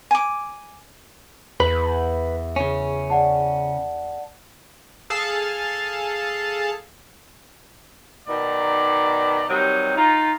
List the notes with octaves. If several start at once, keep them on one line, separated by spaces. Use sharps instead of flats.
G#5 D6
E2 B4 B5
C#3 C#4
D5 F#5 A5
G#4 A4 F5 A5
B2 D#3 D#4 D5
C3 D#3 F#3 G3 D#4
D#4 F4